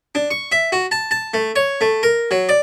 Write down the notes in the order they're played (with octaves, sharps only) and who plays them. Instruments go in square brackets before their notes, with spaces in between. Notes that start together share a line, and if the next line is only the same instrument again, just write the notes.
[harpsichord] D4
C#6
E5
F#4
A5
A5
A3
C#5
A3
A#4
F#3
D5